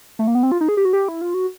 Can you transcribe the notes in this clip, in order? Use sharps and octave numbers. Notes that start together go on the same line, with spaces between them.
A3
A#3
B3
C4
F4
D#4
G#4
G4
F#4
G4
E4
F4
F#4